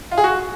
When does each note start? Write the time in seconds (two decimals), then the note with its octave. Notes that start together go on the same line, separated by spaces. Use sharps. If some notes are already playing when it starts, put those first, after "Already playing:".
0.11 F4
0.18 G#4
0.24 F#4